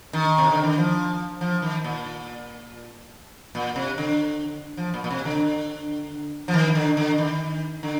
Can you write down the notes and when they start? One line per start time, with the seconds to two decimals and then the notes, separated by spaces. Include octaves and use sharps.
0.13 D#3
0.38 C3
0.51 D3
0.63 D#3
0.78 F3
1.41 F3
1.62 D#3
1.84 A#2
3.55 A#2
3.76 C3
3.98 D3
4.77 F3
4.94 A#2
5.04 A#2
5.11 C3
5.25 D3
6.48 F3
6.54 D#3
6.75 D3
6.97 D3
7.18 D#3
7.83 D3